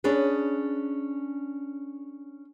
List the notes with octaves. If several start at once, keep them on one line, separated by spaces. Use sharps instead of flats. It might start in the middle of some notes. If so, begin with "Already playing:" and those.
C#4 D4 G#4 B4